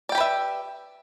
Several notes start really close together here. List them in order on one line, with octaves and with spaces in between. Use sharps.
D5 G5 G4 B4 E5